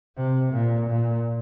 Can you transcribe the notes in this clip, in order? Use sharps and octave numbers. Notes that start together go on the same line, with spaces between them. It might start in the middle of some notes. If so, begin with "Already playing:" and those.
C3
A#2
A#2